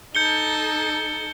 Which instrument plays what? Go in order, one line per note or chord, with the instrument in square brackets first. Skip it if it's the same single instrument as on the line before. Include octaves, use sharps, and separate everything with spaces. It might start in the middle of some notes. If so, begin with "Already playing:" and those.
[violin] D#4 A4 [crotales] G6 C#7 G7